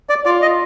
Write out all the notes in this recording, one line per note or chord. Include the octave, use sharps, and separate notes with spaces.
D5
F4 D5
D#5